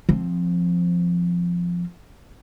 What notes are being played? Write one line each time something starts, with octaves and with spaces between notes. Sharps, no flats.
F3 C4